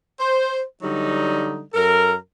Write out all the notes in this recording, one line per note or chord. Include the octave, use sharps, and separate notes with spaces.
C5
D3 F#3 G3 D#4
F#2 A4 A#4